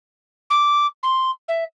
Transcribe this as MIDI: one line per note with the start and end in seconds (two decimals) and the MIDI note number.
0.50 0.87 86
1.03 1.31 84
1.48 1.64 76